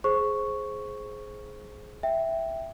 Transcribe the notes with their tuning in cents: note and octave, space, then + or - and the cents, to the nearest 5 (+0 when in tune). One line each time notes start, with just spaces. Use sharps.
G#4 +15 C5 +10 C#6 +0
E5 +0 G5 +0